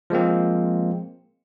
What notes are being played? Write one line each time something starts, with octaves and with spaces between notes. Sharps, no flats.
F3 G#3 A#3 C4